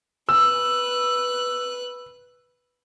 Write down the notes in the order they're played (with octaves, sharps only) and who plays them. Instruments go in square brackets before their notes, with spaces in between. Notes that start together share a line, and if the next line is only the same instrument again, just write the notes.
[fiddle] B4 F#6 [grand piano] E6